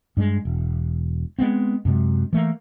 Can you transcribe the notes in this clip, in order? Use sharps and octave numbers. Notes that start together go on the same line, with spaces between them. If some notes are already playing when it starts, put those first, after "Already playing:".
G2 G3 G#3
E1
G#3 B3 C4
F#2 C3 G#3
E3 A3 A#3